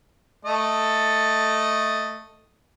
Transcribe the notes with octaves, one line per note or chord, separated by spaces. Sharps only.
A3 A4 D#5